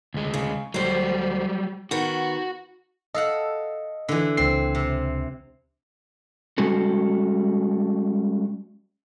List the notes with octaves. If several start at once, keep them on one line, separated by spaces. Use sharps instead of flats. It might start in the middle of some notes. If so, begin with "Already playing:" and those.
D2 G#3
C#3
D2 F#3 G3 C5
D#3 B3 F#4
A4 D#5 F5 F#5
D3 E3
C#2 C4 C7
C3
G3 G#3 C#4 F#4 A4